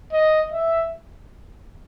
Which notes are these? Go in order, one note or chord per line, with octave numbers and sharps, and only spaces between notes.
D#5
E5